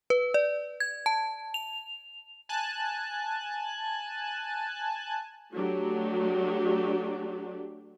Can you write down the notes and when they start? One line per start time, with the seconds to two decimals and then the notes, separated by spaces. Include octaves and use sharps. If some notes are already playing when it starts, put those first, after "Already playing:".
0.10 B4
0.34 D5
0.80 G#6
1.06 A5
1.54 F7
2.49 G#5 A5 F#6
5.55 F#3 A3 D4 F#4 G4